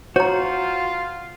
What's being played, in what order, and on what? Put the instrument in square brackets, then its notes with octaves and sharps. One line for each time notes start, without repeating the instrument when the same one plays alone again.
[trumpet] F4 [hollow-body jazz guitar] F#4 [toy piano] C#5 A#5